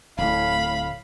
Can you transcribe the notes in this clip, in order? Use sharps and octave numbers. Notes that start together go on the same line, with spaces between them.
D1 A2 F5 B5